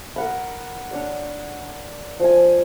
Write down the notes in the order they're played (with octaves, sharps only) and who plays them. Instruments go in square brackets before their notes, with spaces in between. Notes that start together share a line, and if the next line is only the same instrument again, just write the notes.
[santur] A#4 F#5 B5
D4 C#5 D5
F3 A#4 G#5